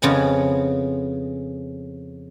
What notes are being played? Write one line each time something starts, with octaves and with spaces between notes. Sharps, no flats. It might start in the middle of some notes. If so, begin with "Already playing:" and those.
F2 C#3 B3 G#5